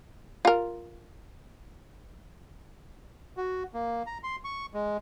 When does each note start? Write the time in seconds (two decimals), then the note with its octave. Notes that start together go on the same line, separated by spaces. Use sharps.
0.45 F4 A#4
3.37 F#4
3.74 A#3
4.06 A#5
4.23 C6
4.44 C#6
4.74 G#3